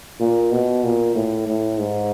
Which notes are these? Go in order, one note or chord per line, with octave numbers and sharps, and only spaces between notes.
A#2
B2
A#2
A2
A2
G#2